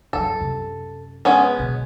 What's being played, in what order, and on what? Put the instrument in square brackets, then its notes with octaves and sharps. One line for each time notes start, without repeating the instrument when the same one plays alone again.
[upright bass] G2 F#3 [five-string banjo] A4
[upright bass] F#2 C3
[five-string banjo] G#3 B3 C#4
[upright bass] B2 D3